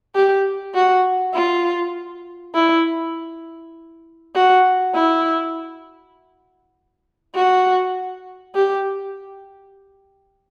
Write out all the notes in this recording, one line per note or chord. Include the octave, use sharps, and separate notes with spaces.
G4
F#4
F4
E4
F#4
E4
F#4
G4